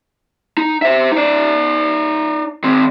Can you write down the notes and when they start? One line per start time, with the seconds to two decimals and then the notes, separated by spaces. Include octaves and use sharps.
0.57 D#4
0.82 C5 E5
1.12 D#4 D5
2.63 D#3 C4